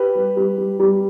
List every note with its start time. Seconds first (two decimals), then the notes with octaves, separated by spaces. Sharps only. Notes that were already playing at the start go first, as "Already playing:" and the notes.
Already playing: G4 B4
0.15 G3
0.37 G3
0.57 G3
0.79 G3